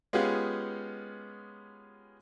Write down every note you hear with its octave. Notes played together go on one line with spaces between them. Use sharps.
G#3 B3 C#4 F4 G4 G#4